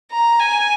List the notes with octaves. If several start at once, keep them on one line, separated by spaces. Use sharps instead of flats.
A#5
G#5